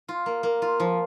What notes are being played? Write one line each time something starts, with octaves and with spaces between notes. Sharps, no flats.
F4
A#3
A#3
F4
F3